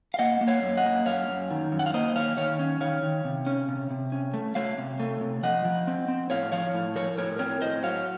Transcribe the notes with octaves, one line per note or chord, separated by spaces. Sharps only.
F5
A#3 D#5 F#5
A#3
C#5 F5
F#2
D#5 F#5
A#3
F#2 C#5 F5
F#2
D#3
F#2
F#5
F5
A#3 C5 D#5
D#3 C#5 F5
D#3 C#5 F5
C#4
D#3 C#5 F5
D#3
C3
C#4
C3
C3
C#4
A3
A3 C#5 F5
C3
A3
C3
F3 D#5 F#5
F3
C4
C4
A2 C#5 F5
F3 C#5 F5
A2
F3 A#4 C#5
A2 A#4 C#5
C4 A#4 C#5
A2 C5 D#5
F#3 C#5 F5